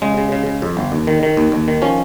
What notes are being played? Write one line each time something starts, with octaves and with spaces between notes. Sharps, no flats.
C#3 G#3
C#3
C#3
C#3
F2
G1
D#2
D#3
D#3
D#2
D#2
D#3
F3 C#4